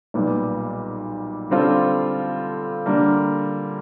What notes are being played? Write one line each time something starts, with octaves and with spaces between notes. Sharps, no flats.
B1 A#2 G3 B3
D3 G3 C4 F4 A4
D3 G3 A#3